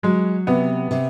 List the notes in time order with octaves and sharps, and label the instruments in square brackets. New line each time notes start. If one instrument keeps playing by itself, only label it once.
[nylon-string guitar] F#3 [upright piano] G#3
[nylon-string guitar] C3 [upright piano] B3
[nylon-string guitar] C3